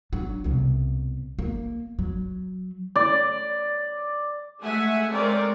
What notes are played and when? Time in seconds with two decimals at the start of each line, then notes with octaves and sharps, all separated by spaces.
0.13 F#3 D4
0.44 C2 B2
1.39 A#3
1.99 F#3
2.96 D5
4.62 G#3 A3 E5 F#5 G#5
5.10 G#3 A3 C4 A#4 C#5 D5